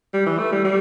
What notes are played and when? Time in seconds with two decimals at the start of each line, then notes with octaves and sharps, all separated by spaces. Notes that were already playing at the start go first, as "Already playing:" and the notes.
0.14 G3
0.27 E3
0.39 A3
0.52 G3
0.65 G3